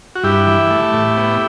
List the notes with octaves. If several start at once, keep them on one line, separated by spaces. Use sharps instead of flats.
F#4
G2 E4 G4
E3
A3
A2
B3